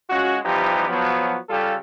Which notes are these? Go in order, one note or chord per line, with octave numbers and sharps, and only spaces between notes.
G#3 C#4 F4 F#4
E3 F3 G3 B3 D#4 G4
F3 F#3 B3
C#3 G3 F4 G4 A4